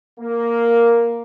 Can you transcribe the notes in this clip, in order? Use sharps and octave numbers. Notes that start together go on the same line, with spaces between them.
A#3